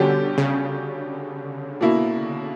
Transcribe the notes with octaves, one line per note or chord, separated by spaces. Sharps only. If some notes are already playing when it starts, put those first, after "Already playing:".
Already playing: B2 D3 G3 C#4 G4
C#3
B2 A#3 E4